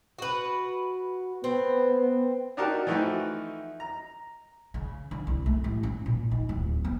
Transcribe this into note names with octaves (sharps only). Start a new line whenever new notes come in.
F#4 B4
B3 C4
D4 D#4 F#4 G4 A#4 A5
E3 F3 A3 D#4 F#4 G5
A#5
C#3
D3
C2
A3
A1
C#4
A#2
D#4
D1
B3